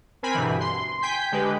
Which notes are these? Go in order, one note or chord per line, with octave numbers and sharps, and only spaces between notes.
C4 A#4 G#5 B5
G2 B2 D3 E3
C6
G5 G#5 G6 B6
D3 G#3 G4 B4